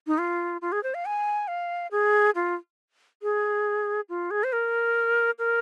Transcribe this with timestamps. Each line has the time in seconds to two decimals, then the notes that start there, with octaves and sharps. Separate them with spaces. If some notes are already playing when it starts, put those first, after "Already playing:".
0.07 D#4
0.18 F4
0.62 F4
0.72 G#4
0.83 C5
0.94 F5
1.06 G#5
1.48 F5
1.91 G#4
2.35 F4
3.22 G#4
4.09 F4
4.31 G#4
4.44 C5
4.53 A#4
5.39 A#4